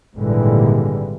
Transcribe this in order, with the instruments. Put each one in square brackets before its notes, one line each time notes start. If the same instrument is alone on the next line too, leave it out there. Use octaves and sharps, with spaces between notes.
[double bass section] G#1 A#2 D3 E3 G3 G#3